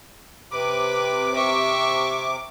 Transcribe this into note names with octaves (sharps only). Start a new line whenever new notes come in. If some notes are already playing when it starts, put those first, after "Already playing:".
C3 B4 D6
E5 C#6